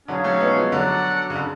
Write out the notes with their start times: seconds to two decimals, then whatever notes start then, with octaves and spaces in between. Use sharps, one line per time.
0.08 D3 F#3 C#4 G#4 C#5 F5
0.24 F#3 A3
0.40 G#3 B3
0.56 F3 G#3
0.72 D3 F#3 F#4 A4 D5 F#5
1.30 C#3
1.35 D3